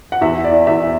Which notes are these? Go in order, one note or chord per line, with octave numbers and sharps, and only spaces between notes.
F#5
E2 E5
D5
E2 E5